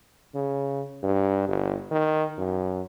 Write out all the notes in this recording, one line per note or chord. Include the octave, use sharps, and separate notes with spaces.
C#3
G2
G1
D#3
F#2